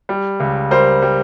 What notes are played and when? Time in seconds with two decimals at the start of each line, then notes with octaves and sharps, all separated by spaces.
0.09 G3
0.40 C#2
0.71 G3 A#4 C5
1.02 G3